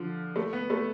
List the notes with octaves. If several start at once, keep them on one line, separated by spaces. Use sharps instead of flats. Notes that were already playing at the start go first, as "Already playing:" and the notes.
Already playing: D3 F3
A3
B3
A3